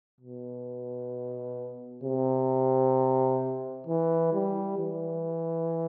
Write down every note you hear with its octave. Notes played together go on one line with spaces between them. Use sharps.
B2
C3
E3
G3
E3